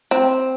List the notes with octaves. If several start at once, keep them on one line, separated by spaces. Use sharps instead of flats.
C4